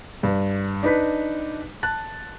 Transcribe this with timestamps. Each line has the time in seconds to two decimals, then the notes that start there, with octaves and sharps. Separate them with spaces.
0.23 G2
0.83 D4 D#4 B4 B6
1.83 A5 F#6 A6